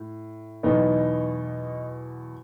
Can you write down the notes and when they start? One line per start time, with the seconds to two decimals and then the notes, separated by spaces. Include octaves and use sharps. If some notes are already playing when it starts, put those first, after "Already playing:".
Already playing: A2
0.63 E2 B2 F#3 B3 D#4